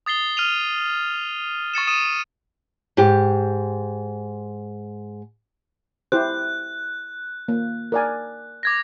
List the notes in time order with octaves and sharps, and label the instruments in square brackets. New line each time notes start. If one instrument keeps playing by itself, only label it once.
[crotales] D#6 A6 C7 G7
F6 D#7 F7
C#6 A6 C#7 E7
D#6 D#7 E7
[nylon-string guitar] G#2 G4
[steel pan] E4 G4 C5 [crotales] F#6
[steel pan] A#3
A#4 D5 G#5
[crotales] D6 G#6 A#6